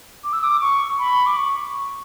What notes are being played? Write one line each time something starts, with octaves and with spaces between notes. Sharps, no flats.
D6
E6
D6
C#6
B5
D6
C#6